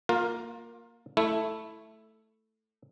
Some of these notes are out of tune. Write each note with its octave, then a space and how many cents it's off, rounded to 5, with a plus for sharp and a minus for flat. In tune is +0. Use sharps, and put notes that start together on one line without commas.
A#3 +0 F4 +25 A#4 +0
A3 +0 E4 +0